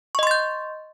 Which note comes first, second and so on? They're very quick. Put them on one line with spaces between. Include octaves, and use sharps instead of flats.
C#6 D#5 C6 A6 G6